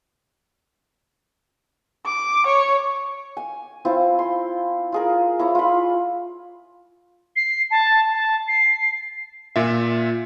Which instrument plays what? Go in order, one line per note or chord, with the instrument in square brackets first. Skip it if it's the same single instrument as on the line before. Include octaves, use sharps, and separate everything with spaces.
[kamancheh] D6
C#5
[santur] G#5
C4 E4 F4
C6
F4 G#4 A#4
E4 C#5 A#5
F4 B5
[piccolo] C7
A5
A5
C7
[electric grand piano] A#2 F4 E5